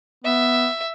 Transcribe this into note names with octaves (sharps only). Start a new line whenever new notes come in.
B3 E5